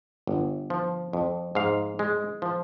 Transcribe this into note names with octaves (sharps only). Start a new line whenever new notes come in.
G1
F3
F2
G#2 F5
G#3
F3